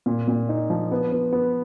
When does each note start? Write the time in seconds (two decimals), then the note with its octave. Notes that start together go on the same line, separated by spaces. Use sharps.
0.06 A#2
0.28 A#2
0.49 D#4
0.70 F3
0.92 B3
1.12 B3
1.33 B3